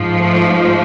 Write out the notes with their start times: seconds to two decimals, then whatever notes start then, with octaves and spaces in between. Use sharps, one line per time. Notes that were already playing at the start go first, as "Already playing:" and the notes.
Already playing: G#2 F3
0.16 A3